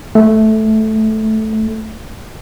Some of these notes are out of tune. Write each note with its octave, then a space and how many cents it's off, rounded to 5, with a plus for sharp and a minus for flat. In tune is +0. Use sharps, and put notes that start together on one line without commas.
A3 -10